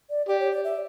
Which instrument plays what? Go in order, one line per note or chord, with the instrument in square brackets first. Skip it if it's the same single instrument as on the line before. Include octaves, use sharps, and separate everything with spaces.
[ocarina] D5
[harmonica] G4 [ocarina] D5
[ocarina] C#5
D5
E5